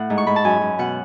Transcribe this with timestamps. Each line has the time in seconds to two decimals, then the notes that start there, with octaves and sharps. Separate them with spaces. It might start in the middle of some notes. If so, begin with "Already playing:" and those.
Already playing: A2 F#5
0.10 G#2
0.18 C#6
0.27 G#2 B5
0.36 A5
0.44 F#2 G#5
0.61 F#2
0.79 B2 F#5